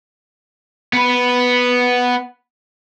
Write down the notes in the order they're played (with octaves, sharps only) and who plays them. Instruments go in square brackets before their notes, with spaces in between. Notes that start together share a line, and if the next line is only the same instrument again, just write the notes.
[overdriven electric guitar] B3 B4